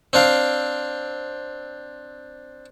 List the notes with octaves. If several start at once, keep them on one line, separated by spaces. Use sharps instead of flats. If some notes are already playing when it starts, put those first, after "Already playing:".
C4 D4 F5